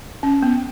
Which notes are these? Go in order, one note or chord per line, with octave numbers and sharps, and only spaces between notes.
C#4
B3